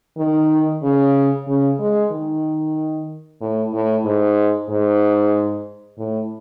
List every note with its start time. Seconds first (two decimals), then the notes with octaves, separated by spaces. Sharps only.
0.17 D#3
0.83 C#3
1.47 C#3
1.79 G#3
2.11 D#3
3.41 A2
3.73 A2
4.05 G#2
4.69 G#2
5.98 A2